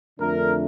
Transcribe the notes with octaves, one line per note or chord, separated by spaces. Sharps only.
F2 D3 A3 D4 A#4